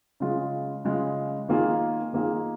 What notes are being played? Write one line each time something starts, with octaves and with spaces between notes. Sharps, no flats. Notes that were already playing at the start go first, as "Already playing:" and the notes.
C#3 G#3 F4
C#3 G#3 F4
D#3 A#3 F4 G#4
D#3 A#3 F4 G#4